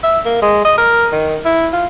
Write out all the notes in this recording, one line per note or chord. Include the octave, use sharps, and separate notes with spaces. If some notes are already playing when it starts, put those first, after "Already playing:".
E5
A#3
G#3
D#5
A#4
D#3
E4
F4